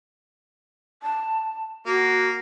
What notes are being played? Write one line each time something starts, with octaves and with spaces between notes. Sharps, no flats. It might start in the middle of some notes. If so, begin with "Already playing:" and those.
A5
A#3 F#4